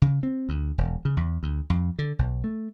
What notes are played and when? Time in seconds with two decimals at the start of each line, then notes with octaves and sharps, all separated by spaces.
0.02 C#3
0.23 C4
0.49 D2
0.78 E1
1.05 C#3
1.17 E2
1.43 D2
1.70 F2
1.99 D3
2.19 B1
2.44 A3